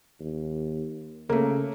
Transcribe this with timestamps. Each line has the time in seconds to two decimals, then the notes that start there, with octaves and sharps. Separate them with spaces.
0.20 D#2
1.30 C#3 A3 A#3